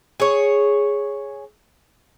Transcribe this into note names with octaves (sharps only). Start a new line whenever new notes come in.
G#4 C#5